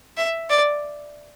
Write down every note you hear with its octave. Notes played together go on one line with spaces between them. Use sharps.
E5
D5